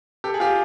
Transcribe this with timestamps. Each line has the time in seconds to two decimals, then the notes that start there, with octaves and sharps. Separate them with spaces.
0.24 G4 A4
0.34 G#4
0.40 F4 G4